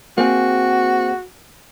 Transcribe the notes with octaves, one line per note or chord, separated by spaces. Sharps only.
A#3 C4 F#4 G#4